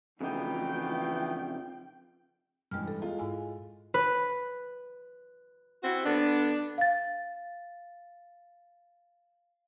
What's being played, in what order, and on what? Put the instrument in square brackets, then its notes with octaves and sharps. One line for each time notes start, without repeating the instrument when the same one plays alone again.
[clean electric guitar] F2 C#3 D#4 [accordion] E3 A3 B3 [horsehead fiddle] F4 G5
[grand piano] A1 G2 [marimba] G#3 G5 F6
[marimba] A4
[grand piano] G#3 F4
[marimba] G#2 E4 G#5
[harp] B4
[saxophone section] C4 E4 F#4
D3 B3 D4
[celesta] F5 A6